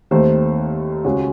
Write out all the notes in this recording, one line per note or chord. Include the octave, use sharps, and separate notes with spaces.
D#2 D#3 A3 C4 C5
C#2 C#3 G#3 F#4